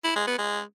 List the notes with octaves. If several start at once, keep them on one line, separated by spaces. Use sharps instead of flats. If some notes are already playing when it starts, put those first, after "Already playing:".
E4
G#3
B3
G#3